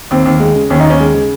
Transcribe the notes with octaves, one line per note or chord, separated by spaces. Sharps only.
D#2 C4
D#2
G#3
C#3
D#2 C#4
D#4
D#2
C#4
G#3
C#3